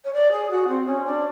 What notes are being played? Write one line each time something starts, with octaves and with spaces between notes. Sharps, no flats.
C#5
D5
G#4
F#4
C4
C#4
D4